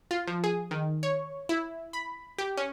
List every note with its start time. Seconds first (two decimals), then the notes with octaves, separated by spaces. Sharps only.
0.11 F4
0.27 F3
0.44 G#4
0.71 D#3
1.03 C#5
1.49 E4
1.93 B5
2.38 G4
2.57 C#4